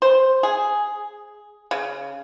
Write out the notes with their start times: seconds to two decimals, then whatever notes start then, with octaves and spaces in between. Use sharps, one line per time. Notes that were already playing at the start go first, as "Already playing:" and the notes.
0.02 C5
0.43 G#4
1.71 C#3